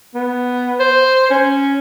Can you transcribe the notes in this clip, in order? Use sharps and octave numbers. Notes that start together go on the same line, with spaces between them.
B3
C5
C#4